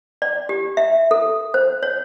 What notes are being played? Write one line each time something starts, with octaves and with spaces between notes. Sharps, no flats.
D5
G4
E5
A4
C5
C#5